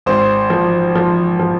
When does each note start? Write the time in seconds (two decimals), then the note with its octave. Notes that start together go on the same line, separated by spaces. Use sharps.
0.06 G#1 C5
0.50 F3
0.95 F3
1.39 F3